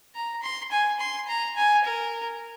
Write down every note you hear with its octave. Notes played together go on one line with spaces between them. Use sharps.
A#5
C6
G#5
C6
A#5
G#5
A#4